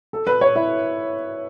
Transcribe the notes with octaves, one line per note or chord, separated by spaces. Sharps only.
A4
B4
C#5
E4